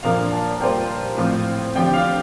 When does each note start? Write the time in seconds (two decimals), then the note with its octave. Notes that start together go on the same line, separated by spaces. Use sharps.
0.03 A#2 F3 A#3 D4 F5
0.32 A5
0.61 G3 A#3 F4 C5 G5
1.17 A2 F3 C4 F4
1.75 D3 F3 C4 G4 G5
1.93 F5